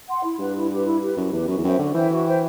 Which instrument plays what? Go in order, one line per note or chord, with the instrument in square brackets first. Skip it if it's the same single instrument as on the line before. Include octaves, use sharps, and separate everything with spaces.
[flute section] F#5 C6
E4
[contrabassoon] G2 [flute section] G4 B4
[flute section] E4
G4 B4
E4
G4 B4
[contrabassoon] F#2 [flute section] E4
[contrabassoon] E2 [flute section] G4 B4
[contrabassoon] F#2 [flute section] F#4
[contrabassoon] E2
[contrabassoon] F#2 [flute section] C5 E5 G5
[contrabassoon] D3 [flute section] F#4
[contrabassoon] E3 [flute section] C5 E5 G5
[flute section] F#4
C5 E5 G5